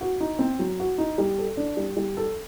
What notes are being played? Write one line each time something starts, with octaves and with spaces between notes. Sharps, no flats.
F#4
D#4
C4
F#3
F#4
D#4
G3
A4
D4
G3
G3
A4